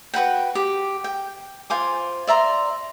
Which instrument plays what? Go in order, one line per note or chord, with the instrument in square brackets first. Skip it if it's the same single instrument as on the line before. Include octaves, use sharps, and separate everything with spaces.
[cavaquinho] F#4 B4 F#5 G5
G4
G5
F4 C5 G#5 D6
D5 E5 A#5 C6